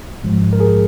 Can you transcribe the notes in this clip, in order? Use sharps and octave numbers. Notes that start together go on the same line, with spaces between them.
G#2 F3 G#3
A#4
G#4